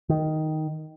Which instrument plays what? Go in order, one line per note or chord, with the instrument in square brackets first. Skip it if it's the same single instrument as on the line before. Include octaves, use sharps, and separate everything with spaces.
[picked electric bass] D#3